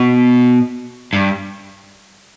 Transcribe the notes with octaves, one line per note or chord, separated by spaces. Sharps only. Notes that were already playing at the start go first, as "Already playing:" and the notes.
Already playing: B2
G2